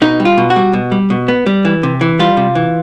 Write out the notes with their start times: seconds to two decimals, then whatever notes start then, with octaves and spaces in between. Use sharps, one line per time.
0.02 B2 D#4
0.20 G3
0.25 F4
0.38 B2
0.50 F#4
0.56 G3
0.73 B2
0.92 G3
1.10 B2
1.28 B3
1.46 G3
1.65 E3
1.83 C3
2.01 E3
2.19 G3 F4
2.37 C3
2.55 E3